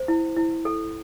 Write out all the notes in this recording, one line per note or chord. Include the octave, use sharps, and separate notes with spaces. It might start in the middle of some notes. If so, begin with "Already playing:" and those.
Already playing: C5
E4
E4
A4